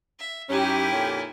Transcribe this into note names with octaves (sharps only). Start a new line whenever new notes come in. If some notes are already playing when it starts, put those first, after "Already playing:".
E5
F#2 C#4 D#4 E4 G4
F2 A#2 C#4